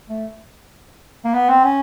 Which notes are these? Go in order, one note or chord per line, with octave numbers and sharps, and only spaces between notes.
A3
A#3
B3
C4
C#4